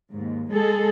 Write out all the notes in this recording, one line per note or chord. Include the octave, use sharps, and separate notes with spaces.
D#2 G#2
G#3 G#4 A4